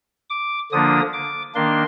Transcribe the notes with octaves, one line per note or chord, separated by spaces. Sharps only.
D6
D3 F3 A#3 D4 D#6
D6
D#3 A#3 D4 C6